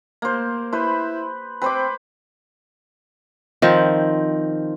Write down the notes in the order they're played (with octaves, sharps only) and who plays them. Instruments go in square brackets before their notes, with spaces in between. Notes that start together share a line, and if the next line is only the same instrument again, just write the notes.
[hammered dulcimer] A#3 C5
[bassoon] E4 [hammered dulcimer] B4 C5
[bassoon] C4 [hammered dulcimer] B4 C5 D6
[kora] D#3 F3 C4